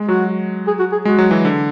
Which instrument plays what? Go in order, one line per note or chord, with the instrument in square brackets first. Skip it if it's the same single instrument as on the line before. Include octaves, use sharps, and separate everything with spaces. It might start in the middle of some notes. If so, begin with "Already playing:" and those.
Already playing: [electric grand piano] G#3
[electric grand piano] F#3 [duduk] F#4
[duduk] G#4
F#4
G#4
[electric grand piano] G#3 [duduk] F#4
[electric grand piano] F#3
E3
D3